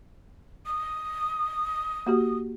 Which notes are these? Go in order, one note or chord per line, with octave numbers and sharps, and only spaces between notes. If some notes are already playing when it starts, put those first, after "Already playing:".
D#6
A#3 F#4 G4